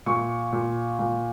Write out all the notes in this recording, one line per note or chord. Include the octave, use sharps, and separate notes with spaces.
A#2 C#6
A#2
A#2